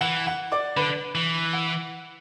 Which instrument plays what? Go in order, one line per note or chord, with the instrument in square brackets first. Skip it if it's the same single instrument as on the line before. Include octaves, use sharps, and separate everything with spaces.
[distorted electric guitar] E3 [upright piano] F#5
[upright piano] F#5
D5 D6
[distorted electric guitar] D3 [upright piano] B4 B5
[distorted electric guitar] E3
[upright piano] F#5